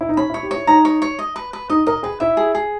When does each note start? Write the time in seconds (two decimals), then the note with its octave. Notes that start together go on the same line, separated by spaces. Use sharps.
0.01 E4
0.09 D#4
0.17 C#4 B5
0.30 E4
0.34 C#5
0.43 G4
0.51 E4 C#5
0.67 D#4 A#5
0.85 C#5
1.02 C#5
1.19 D#5
1.36 B4
1.53 B4
1.70 D#4 D#5
1.87 A#4 D#5
2.03 G#4 B4
2.20 E4 E5
2.37 G#4
2.55 G#4